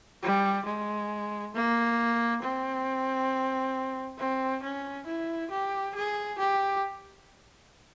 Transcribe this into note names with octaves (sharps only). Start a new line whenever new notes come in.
G3
G#3
A#3
C4
C4
C#4
E4
G4
G#4
G4